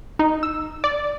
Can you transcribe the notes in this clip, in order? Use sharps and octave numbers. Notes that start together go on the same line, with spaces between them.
D#4
E6
D5